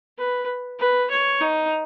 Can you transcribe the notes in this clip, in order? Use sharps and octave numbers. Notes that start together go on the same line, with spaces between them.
B4
B4
C#5
D#4